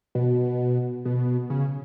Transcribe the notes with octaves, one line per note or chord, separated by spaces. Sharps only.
B2
B2
C#3